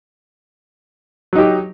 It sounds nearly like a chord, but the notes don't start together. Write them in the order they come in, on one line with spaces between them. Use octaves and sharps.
F#3 D#4 G4